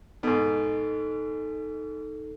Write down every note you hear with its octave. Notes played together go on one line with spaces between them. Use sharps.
G#2 B2 D#4 A4